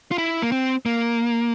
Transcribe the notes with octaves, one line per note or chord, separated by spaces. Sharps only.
F4
E4
A#3
C4
A#3